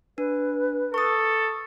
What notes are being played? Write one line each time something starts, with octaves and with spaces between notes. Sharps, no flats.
D4 B4
A4 C#6 D#6